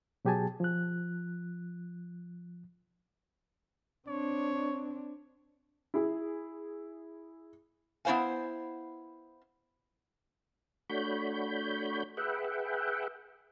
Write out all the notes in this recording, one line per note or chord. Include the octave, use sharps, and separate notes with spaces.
B2 F#3 G4 G#4 G#5 A5
F3 F#6
C4 D4 C#5
E4 G#4
B3 E4 F#4 C5 F5 G#5
A3 D4 F#4 C#5 B5 G6
G#4 B4 E5 F#5 G5